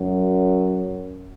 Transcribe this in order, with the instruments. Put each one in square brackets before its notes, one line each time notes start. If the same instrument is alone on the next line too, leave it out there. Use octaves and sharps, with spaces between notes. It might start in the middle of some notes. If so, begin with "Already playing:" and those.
Already playing: [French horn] F#2